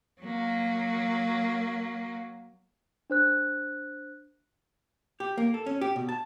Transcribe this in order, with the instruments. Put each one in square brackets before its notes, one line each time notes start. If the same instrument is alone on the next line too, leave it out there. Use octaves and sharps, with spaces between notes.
[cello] F#3 A#3
[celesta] D4 C5 F#6
[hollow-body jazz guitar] G4
A#3
A4
C#4
G4
B2
A5